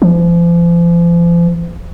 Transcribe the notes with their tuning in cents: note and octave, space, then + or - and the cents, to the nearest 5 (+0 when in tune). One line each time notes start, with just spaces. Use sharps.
F3 -40